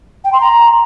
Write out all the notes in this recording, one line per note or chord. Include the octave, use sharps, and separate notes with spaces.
G5
C6
A#5